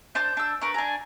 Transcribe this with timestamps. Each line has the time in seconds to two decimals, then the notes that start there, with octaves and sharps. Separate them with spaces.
0.15 D4 C5 A5 G6
0.37 D4 E6
0.61 D4 A#4 B4 C#6
0.74 D4 G#5 A#5